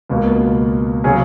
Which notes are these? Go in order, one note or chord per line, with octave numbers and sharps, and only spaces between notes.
C#2 B2 A#3
C#3 F#3 C#4 G#4